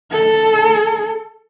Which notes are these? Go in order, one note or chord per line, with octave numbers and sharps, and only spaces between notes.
A4